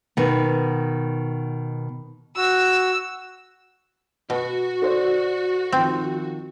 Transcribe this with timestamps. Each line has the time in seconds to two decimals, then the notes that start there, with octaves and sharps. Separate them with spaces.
0.17 B2 D#3
2.37 F#4 E6
4.30 B2 F#4
4.82 A4 C5 D5
5.72 D#3 F3 C4